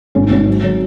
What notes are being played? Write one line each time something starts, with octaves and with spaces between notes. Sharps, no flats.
G#1 C#4
D#4
G#1 C#4
F#3
F#3